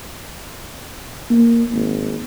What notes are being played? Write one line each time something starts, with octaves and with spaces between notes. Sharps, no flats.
A#3
G#1